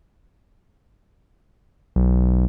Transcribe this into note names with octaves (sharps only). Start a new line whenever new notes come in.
B1